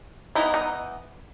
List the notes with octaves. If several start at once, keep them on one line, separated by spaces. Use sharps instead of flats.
E3 B3 D#4 E4
D#4